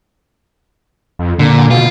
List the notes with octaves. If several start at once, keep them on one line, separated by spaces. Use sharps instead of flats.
F2
A#2 D3
B2 F4